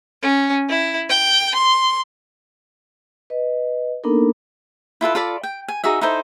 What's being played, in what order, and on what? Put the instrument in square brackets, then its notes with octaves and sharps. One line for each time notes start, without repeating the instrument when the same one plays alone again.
[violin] C#4
E4
G5
C6
[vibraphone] B4 D#5
A#3 B3 D4 D#4 A4 A#4
[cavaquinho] E4 F4 A4 B4
F4 A4 D5 B5
G5
G#5
D#4 F#4 G#4 E5
D#4 E4 A4 C5